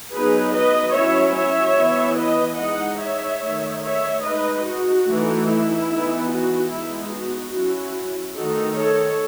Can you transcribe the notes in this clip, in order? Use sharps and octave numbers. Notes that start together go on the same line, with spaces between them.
F#3 B3 D#4 G#4 B4
B4 D#5
F#3 C#4 E4 C#5 E5
C#5 E5
E3 B3 E4
B4 D#5
G#3 D#4 D#5 F#5
C#5 E5
D#3 A3 D#4
C#5 E5
G#3 D#4 B4 D#5
F#4
E3 A3 D#4
E4
E3 B3 D#4
F#4
G#3 B3 D#4 E4
F#4
F#3 C#4 E4
D#3 A3 D#4 F#4 A4
A4 C#5